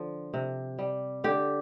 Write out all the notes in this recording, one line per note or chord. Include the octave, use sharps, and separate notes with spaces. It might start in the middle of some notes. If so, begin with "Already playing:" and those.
Already playing: D3 F3
C3
G3
D3 G4